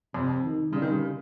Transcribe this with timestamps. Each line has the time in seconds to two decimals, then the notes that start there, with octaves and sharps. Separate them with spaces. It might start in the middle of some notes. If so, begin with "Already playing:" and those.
0.14 F2 C3
0.42 D#3
0.71 C#3 G3
0.82 D#3
0.92 C#3